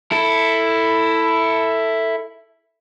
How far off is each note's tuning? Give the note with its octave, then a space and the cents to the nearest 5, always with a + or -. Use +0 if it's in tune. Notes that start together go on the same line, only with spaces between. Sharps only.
E4 +0 A4 +15